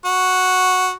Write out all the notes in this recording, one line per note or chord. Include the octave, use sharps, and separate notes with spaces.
F#4